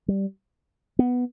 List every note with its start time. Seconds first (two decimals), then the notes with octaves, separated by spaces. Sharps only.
0.08 G3
0.99 B3